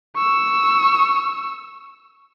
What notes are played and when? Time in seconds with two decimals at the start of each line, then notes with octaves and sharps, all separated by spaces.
0.16 C#6 E6